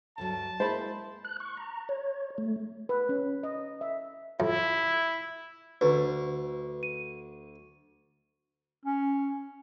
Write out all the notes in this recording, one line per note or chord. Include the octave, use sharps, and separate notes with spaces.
D2 G2 F#3 A5
G#3 A#3 E4 C5 B5
F#6
C#6
A#5
C#5
A3
B4
C#4
D#5
E5
F2 E4
D2 B4
D#7
C#4